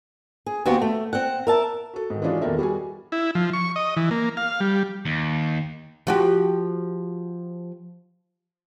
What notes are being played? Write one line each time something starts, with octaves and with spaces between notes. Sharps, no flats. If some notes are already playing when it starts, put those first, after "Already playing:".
G#4
D#2 B3 F#4 G4 C5
A3
C4 F#5
A#4 E5 A5
F#4 A4
G#2 D#3
E3 G#3 C#4 D4 F4 F#4
E2 A#2 D#3 A4 A#4 E5
G3 F#4 G#4 G#5
E4
F3
C#6
D#5
E3
A#3
F5
G3
D#2
F3 F#4 G4